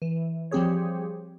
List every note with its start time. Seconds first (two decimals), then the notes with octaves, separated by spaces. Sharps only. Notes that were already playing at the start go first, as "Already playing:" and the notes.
0.02 E3
0.51 F3 G3 C4 G4 G#4 C#5